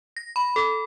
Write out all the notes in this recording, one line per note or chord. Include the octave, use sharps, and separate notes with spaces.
A#6
B5
A4